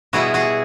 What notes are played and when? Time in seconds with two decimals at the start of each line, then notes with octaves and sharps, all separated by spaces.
0.13 B2 G3 B3 E4 F#4 G#4
0.34 F#4 G#4